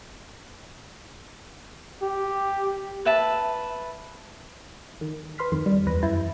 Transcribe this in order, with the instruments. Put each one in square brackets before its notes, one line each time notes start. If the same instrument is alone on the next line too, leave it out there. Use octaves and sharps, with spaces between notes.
[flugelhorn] G4
[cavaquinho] B4 E5 A5
[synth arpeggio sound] D#3
B4 C6 F6 B6
F2 D#3 C6
G3
E2 B4 A#6
F#2 E4 G6 A6 C7